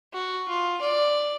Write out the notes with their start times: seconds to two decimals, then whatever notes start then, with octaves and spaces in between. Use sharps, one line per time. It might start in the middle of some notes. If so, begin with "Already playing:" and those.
0.14 F#4
0.48 F4
0.81 D5